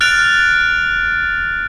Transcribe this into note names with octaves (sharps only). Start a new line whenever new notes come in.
F6 F#6 A6 D7 F7